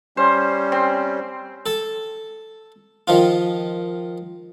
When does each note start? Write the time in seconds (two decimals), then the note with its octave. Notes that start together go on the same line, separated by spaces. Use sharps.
0.17 G3 C#4 C5
0.72 C4
1.66 A4 A5
3.08 D#3 F3 F4